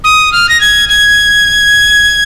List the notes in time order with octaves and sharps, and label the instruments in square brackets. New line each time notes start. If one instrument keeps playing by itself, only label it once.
[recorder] D#6
F6
A#6
G#6
G#6